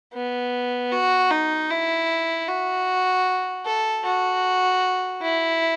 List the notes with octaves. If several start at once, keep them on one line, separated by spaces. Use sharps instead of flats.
B3
F#4
D#4
E4
F#4
A4
F#4
E4